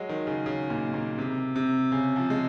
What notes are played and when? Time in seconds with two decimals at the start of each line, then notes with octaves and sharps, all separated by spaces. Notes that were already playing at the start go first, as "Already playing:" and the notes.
Already playing: F#3 G#3
0.09 D#3
0.27 C#3
0.46 C#3
0.70 A#2
0.94 A#2
1.18 C3
1.56 C3
1.92 C#3
2.16 F3
2.30 G#3